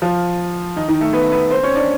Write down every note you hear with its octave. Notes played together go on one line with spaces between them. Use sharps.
F3 F4
D#3 D#4
D#3 D#4
A3 A4
B3 B4
B3 B4
C4 C5
C#4 C#5
D4 D5